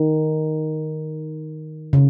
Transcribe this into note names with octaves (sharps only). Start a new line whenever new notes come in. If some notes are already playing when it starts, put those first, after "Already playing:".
Already playing: D#3
C#3